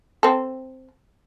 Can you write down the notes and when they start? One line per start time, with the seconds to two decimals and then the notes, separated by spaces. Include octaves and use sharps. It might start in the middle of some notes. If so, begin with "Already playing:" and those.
0.23 C4 A4